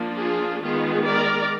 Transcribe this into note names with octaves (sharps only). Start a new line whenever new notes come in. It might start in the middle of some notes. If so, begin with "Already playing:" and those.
Already playing: F3 A#3 D4
F4 G#4
D#3 G#3 B3 F4 G#4
A#4 D5